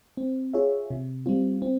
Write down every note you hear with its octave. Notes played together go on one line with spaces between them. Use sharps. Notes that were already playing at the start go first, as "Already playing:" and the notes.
C4
F4 G#4 C#5 E5
C3
G3 C4 F4
C4